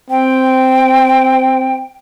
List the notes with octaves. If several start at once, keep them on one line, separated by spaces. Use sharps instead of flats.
C4 G5